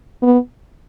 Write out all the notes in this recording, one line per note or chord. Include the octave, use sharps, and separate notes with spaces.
B3